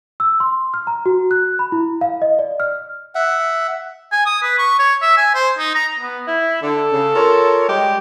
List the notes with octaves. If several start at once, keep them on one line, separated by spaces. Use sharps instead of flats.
E6
C6
F6
A#5
F#4
F#6
B5
E4
F5
D#5
D5
F6
E5 F#5
G#5
D#6
B4
C#6
C#5
E5
G#5
C5
D#4
A#5
B3
E4
D3 A4
C#3
F4 A#4 C#5
G3 G#3 G4